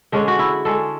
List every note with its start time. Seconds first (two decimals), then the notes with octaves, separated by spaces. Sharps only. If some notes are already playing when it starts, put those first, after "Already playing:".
0.12 D3 G#3 C#4 D4
0.28 F#4
0.39 E4
0.65 D3 G#3 C#4 A4